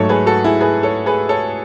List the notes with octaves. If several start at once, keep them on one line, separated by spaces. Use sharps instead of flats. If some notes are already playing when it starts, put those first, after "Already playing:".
Already playing: G#2 F#3 A3 A4 C#5
G#4 B4
F#4 A4
E4 G#4
G#4 B4
A4 C#5
G#4 B4
A4 C#5